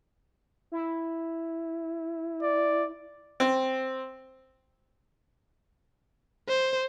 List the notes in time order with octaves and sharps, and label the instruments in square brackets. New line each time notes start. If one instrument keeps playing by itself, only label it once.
[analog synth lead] E4
[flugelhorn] D5
[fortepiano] C4
[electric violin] C5